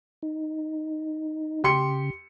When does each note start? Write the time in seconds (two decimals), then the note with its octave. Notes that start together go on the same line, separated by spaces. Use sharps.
0.23 D#4
1.64 C#3 G4 C6 C#7